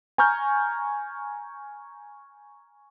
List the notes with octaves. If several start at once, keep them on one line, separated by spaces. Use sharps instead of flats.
G#5 A#5 C#6 F6 G6